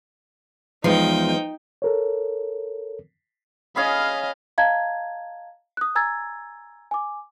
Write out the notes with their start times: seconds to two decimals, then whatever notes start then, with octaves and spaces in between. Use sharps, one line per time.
0.84 E2 F3 G#3 D#4 G5
1.82 A4 A#4 C#5
3.76 C#4 G#4 D#5 F5 B5
4.58 D#5 F5 A5 A#5 G#6
5.77 D#6 F#6
5.95 G#5 A#5 E6 G#6 A6
6.91 G#5 D6